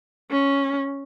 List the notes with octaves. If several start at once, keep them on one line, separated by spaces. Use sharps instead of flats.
C#4